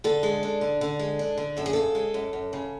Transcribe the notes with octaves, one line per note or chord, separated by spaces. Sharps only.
D3 A4
G#3
D4
D3
D3
G#3
D4
D3
F#2 A4
G#4
C#3 A4
G#3
F#2
F#2
C#3